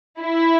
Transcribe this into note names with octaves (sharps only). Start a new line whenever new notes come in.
E4